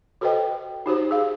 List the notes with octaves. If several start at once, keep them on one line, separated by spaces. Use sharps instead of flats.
F#4 A4 B4 C5 D#5 G5
D#4 F#4 G4 C5
G#4 F5